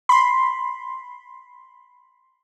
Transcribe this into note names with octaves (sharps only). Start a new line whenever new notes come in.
B5 C6